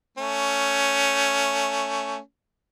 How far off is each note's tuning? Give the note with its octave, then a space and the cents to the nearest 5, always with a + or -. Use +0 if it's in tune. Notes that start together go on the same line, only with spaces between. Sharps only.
A3 +15 C#4 +10